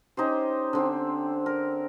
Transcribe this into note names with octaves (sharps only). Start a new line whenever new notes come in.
C#4 D#4 G4 C5
D3 C4
A#4